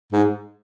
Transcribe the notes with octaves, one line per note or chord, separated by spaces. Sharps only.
G#2